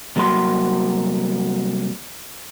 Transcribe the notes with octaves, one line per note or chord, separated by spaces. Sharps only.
C2 F#3 A#3 F#4 C6